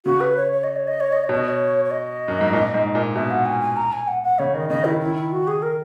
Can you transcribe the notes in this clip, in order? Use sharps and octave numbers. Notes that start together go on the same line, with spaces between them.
C#3 F#4
B4
C#5
C#5
D#5
C#5
D#5
C#5
D#5
C#5
B2
D#5
C#5
C#5
D#5
F#2
G#2
A#2
G#2
A#2
B2 E5
F#5
G#5
G#5
A#5
G#5
F#5
F#5
C#3 C#5
D#3 D#5
C#3 D#5
D#3 E4
D#3 E4
E4
F#4
G#4
A#4